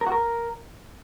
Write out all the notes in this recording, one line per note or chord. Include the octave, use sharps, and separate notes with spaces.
A#4
F#4
A#4